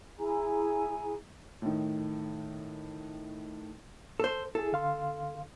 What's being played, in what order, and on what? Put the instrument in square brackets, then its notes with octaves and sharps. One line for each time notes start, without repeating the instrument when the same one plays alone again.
[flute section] E4 G#4 G#5 A#5
[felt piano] A2 D#3
[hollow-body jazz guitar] A4 C5
[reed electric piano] E4 G#4 [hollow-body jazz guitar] A4
[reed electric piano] D3 F5 C6